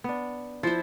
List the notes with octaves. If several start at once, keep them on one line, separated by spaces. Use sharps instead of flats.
B3 D4
F3 E4 C5